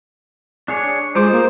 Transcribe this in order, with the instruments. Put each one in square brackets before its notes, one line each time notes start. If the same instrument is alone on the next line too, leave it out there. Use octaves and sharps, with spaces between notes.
[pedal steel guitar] D4 G#4 C#5
[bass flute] G#3 [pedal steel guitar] D#4 F4 D6 [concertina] C5
[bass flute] A#3